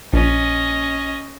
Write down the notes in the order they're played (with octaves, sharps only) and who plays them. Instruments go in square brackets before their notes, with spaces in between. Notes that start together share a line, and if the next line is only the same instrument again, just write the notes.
[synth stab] A#1 [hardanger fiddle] C#4 D#5